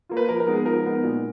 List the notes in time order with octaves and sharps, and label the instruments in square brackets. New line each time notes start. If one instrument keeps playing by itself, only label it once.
[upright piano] A#3 F4
B4
F3 A#4
A#4
G#3 B3 D#4
G#4
F3 A#4
G#3 B3 D#4
A#2